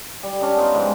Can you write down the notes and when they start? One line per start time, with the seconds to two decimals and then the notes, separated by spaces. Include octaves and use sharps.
0.23 G3
0.41 C#4 D4 D#5
0.57 B3 D#4 F4
0.75 G#2 F3 G#3 G5